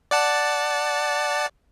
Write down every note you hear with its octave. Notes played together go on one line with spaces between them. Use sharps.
D5 F#5 A5